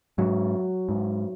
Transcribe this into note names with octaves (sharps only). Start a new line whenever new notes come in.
G#2 F#3
G#2